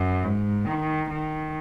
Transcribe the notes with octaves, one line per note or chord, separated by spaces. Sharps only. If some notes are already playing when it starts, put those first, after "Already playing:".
Already playing: F#2
G#2
D#3
D#3